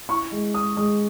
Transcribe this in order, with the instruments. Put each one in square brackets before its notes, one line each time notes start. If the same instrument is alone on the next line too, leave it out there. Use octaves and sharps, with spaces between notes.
[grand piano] E4 C#6
G#3
G#3 D#6
G#3 D#6